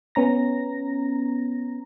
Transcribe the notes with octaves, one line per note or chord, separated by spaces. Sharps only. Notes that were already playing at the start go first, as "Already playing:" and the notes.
B3 C#4 A#5 A#6